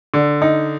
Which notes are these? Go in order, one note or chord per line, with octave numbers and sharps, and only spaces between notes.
D3
D#4